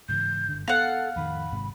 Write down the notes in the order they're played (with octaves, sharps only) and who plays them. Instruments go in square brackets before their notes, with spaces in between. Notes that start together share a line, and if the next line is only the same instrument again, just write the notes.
[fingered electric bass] G#2 C#3 E3 [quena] G6
[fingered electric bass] G1 D3
[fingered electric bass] B3 [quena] A4 [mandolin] F5 F#5
[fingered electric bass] F2 A2 D#3 [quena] B5
[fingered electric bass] G#1 G#2 C3